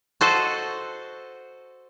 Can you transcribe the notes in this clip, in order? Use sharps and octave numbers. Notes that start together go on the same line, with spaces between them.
F#4 A4 C5 D#5